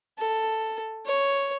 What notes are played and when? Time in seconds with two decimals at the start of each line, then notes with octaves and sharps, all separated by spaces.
0.19 A4
1.06 C#5